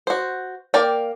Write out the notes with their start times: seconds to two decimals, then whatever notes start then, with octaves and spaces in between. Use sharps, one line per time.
0.07 F#4 C5
0.74 A#3 A#4 D5 G5